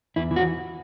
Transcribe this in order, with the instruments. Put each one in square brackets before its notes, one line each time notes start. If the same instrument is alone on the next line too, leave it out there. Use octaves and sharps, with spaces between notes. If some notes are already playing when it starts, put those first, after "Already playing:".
[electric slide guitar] E2 E4
E3
F#4